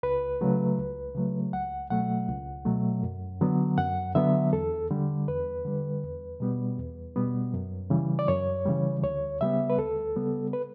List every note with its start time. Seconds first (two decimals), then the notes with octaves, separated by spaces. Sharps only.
0.03 C#2 B4
0.41 C#3 F#3 A3
0.78 C#2
1.15 C#3 F#3 A3
1.53 C#2 F#5
1.90 B2 F#3 A3 F#5
2.28 C#2
2.65 B2 F#3 A3
3.03 F#2
3.41 D3 F#3 B3
3.78 F#2 F#5
4.15 D3 F#3 B3 E5
4.53 E2 A4
4.91 D3 G3
5.28 E2 B4
5.65 D3 G3
6.03 E2
6.40 B2 G3 B3
6.77 E2
7.16 B2 G3 B3
7.54 F#2
7.90 C#3 E3 G3
8.19 D5
8.28 F#2 C#5
8.66 C#3 E3 G3
9.03 D2 C#5
9.41 C#3 G3 B3 E5
9.70 B4
9.78 D2 A4
10.16 C#3 G3 B3
10.53 B4